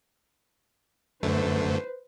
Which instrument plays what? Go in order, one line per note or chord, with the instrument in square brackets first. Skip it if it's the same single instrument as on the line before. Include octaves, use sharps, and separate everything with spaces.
[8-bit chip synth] F#2 D3 A3 [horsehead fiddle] B4 C5